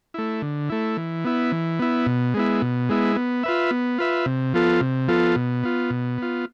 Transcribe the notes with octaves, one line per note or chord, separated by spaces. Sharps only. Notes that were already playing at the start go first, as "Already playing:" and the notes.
A3 E4
D3
A3 E4
E3
B3 E4
E3
B3 E4
B2
G#3 B3 E4
B2
G#3 B3 E4
B3
F4 B4 E5
B3
F4 B4 E5
C3
F3 B3 F4 A4
C3
F3 B3 F4 A4
B2
B3 F4
B2
B3 F4